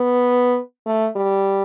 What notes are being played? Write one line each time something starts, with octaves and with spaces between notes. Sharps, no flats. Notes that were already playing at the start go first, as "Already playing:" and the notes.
Already playing: B3
A3
G3